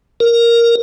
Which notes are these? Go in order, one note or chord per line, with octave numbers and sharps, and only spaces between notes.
A#4